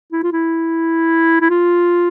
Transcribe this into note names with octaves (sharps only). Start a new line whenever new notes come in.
E4
F4
E4
E4
F4